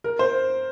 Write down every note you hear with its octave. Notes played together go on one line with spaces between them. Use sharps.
A#4
C5